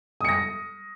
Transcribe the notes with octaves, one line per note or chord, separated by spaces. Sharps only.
D#6 A#6 C#7